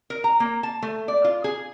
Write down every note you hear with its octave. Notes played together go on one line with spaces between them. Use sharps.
A#4
A#5
A#3
A5
A3
D5
F4
G#4